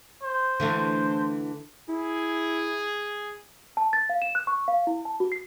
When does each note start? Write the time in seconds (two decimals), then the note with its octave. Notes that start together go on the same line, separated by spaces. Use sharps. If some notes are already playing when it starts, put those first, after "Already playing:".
0.23 C5
0.60 D3 E3 A3
1.89 E4 G#4
3.77 A5
3.93 A6
4.09 F5
4.22 E7
4.35 F#6
4.47 C#6
4.68 F5
4.87 E4
5.05 A5
5.20 F#4
5.32 C7